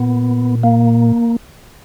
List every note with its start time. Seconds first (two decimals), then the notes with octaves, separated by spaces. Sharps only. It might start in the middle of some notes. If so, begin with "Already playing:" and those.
Already playing: A#2 B3
0.63 A#3